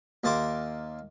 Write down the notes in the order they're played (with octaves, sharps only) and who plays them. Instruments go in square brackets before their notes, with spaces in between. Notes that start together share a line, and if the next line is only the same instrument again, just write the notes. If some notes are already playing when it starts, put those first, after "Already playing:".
[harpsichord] D#2 A#3 A5 C6 D6